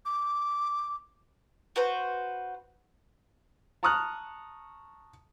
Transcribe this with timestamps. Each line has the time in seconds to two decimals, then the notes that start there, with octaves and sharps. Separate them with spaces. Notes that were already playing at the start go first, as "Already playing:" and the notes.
0.05 D6
1.76 F#4 B4 C5
3.83 A5 A#5 C#6 D#6 F6 F#6